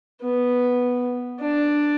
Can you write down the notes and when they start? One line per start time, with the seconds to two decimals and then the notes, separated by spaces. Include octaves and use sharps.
0.22 B3
1.40 D4